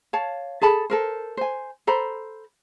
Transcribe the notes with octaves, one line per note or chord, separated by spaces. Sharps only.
C#5 F5 A5
G#4 A4 A5 B5
A4 A#4 C5
C5 G#5
A4 C5 A#5 B5